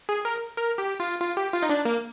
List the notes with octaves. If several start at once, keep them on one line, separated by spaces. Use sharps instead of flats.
G#4
A#4
A#4
G4
F4
F4
G4
F4
D#4
D4
A#3